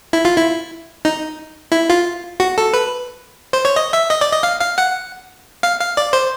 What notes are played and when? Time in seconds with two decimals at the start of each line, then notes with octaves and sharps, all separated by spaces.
0.13 E4
0.25 F4
0.37 E4
1.05 D#4
1.72 E4
1.90 F4
2.40 F#4
2.58 A4
2.73 B4
3.53 C5
3.65 C#5
3.76 D#5
3.93 E5
4.10 D#5
4.21 D5
4.32 D#5
4.43 F5
4.61 F5
4.78 F#5
5.63 F5
5.80 F5
5.97 D5
6.13 C5